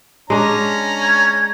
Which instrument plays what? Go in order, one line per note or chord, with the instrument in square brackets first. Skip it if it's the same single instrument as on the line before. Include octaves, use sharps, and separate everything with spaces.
[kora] G#3 D4 [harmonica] C#4 A#5
[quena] G#6